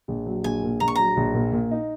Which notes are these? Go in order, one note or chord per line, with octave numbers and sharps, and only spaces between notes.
A#1
F#3
A#1 G#5
A#2
A#1 A#5
C#6
F#3 A#5
A#1
A#2
A#2
D#4